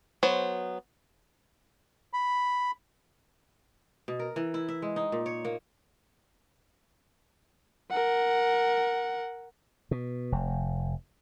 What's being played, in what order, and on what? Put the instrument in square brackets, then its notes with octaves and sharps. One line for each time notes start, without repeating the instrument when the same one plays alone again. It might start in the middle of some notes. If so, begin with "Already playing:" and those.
[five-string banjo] F#3 B3 C5
[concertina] B5
[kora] B2
A#4
E3
E4
E5
G#3
D#4
A#2
C#5
A#3
[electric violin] A#4 F#5
[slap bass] B2
F1